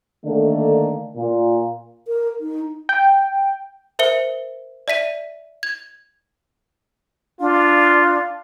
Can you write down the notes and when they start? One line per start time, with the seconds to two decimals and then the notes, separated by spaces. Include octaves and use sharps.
0.25 D3 D#3 A3 A#3 D4
1.16 A#2
2.08 A#4
2.40 D#4
2.89 G5
3.99 A#4 C5 E5 C#7 G7
4.88 D5 E5 B6 D#7
5.63 G#6
7.40 D4 F4